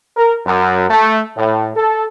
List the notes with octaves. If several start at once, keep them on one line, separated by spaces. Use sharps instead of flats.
A#4
F#2
A3
A2
A4